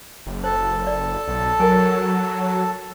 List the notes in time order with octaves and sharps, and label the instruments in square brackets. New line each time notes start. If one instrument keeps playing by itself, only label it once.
[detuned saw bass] F#1
[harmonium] A4 A5 [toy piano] C5
[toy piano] D5
[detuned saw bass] B1
[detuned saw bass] F#3 [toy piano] A#4 G#5